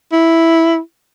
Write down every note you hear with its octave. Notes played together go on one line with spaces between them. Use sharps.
E4